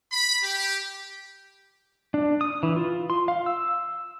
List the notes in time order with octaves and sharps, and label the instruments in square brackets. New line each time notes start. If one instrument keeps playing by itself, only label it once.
[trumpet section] B5
G4
[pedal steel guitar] D4
D#6
E3
F4
C6
F5
E6